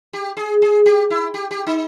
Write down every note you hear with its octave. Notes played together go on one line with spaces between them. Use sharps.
G4
G#4
G#4
G4
E4
G4
G4
D#4